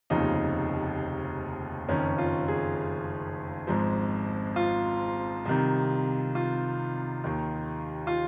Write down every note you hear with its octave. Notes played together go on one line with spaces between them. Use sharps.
F1 D#2 C#3 F3 D#4
F#1 F2 D#3 C#4
F4
G#4
G#1 G#2 F3
F4
C2 C3 D#3
F4
D#2 D#3
F4